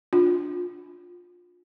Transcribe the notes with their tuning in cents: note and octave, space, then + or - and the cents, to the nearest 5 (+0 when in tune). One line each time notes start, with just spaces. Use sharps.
D4 +0 F4 +25